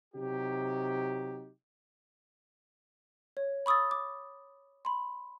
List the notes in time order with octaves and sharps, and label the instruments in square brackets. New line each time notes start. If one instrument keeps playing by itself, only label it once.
[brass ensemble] C3 F#3 D#4 G4
[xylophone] C#5
B5 C#6 D#6 E6 A6
D6
B5 C6